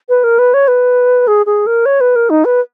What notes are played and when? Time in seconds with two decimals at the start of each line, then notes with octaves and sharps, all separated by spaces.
0.09 B4
0.24 A#4
0.39 B4
0.54 C#5
0.68 B4
1.27 G#4
1.46 G#4
1.67 A#4
1.86 C#5
2.01 B4
2.16 A#4
2.30 D#4
2.45 B4